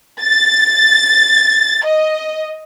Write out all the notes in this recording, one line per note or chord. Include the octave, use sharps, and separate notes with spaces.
A6
D#5